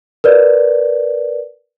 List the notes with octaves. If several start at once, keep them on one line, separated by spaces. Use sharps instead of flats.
A#4 B4 D5